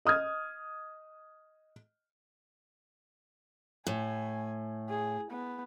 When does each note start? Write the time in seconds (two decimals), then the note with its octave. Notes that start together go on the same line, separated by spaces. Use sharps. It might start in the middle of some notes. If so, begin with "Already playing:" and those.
0.05 D#5 D#6 F6 G#6
3.87 A2 G#5
4.89 G#4
5.31 B3